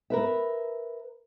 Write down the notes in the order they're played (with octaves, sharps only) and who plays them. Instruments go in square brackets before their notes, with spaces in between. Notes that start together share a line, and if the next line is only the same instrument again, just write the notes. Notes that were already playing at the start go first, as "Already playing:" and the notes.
[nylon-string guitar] A#4 B4 E5